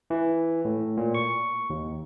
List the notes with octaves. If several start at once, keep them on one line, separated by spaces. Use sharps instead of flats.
E3
A2
A#2
C#6
D#2